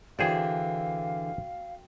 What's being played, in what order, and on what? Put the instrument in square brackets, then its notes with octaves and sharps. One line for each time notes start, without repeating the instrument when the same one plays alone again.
[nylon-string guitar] D3 E3 [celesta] F#4 G5 [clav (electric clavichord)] G#4 C5 D5 [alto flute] F5